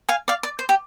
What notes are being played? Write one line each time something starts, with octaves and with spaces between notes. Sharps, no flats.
F5 G#5
D5 F5
D5
C5
G4